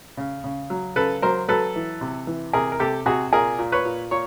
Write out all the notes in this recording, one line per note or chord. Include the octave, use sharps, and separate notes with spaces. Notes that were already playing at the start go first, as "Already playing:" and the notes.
C#3
C#3
F#3
C#3 A4 B4
F#3 A#4 C5
F#3 A4 B4
E3
C3
E3
C3 G#4 A#4
A#4
C3 G4 A4
C3 F#4 G#4
A#2 G#4 A#4
A#2
B4 C#5
A#2
A#2 C#5